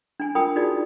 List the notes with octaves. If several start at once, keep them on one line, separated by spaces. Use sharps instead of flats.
D4 G#5
F4 A#4 G5 B5 D#6
D#4 F4 F#4 G#4 D5